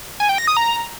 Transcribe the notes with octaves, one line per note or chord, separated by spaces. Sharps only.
G#5
G5
A#6
D#6
A#5